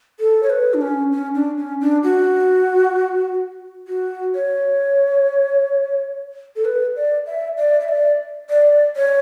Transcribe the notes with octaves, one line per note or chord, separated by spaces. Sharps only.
A4
C#5
B4
D4
C#4
C#4
D4
C#4
D4
F#4
F#4
C#5
A4
B4
D5
E5
D5
E5
D5
D5
C#5